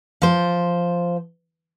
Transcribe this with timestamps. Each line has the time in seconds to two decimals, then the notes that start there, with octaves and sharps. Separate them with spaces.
0.22 F3 C5